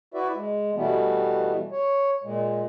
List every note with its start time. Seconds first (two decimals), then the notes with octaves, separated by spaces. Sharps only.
0.14 E4 F#4 B4 D5 E5
0.35 G#3
0.75 B2 E3 G3 A3 B3
1.72 C#5
2.24 A#2 G#3